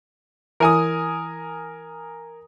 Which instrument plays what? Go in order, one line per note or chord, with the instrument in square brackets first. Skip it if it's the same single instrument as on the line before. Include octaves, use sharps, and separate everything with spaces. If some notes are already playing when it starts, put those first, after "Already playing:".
[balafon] E3 E4 E5 [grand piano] A#4 G#5 D#6